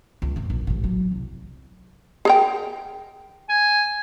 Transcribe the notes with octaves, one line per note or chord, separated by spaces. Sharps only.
C#2
F2 G#2
A#1
A1 G#2
F#3
C2
G#4 A#4 G5
G#5